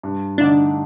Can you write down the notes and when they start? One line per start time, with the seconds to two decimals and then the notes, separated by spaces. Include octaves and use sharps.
0.03 G2
0.38 D3 A3 D4 D#4